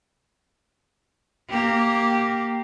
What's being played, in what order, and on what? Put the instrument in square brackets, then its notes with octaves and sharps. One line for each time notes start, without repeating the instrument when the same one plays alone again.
[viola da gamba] A#3 G4